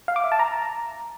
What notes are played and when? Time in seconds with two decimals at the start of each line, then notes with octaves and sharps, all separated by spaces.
0.08 F5
0.16 D6
0.24 E5
0.32 A5
0.39 A#5